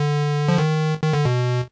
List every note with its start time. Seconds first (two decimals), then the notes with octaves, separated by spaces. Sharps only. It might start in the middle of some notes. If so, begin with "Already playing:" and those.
Already playing: D3
0.49 F3
0.58 D#3
1.02 D#3
1.13 D3
1.25 B2